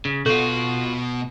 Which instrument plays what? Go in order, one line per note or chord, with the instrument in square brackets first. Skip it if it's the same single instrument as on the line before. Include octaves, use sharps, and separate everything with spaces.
[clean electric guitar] C#3
[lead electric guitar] B2 B3 [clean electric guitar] F4 F#4 [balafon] A4